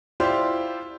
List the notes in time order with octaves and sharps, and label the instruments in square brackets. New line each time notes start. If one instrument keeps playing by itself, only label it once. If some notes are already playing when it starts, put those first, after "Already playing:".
[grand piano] E4 F4 G4 C5 D5 C6